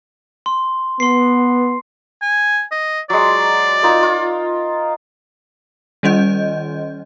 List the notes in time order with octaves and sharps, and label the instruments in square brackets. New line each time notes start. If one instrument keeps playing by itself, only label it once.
[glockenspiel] C6
[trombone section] B3 [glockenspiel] C6 C7
[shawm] G#5
D#5
[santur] F#3 G#3 [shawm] D5
[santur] D#4 F4 A#4
F4
[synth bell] D#3 G3 C#4 D#5 G6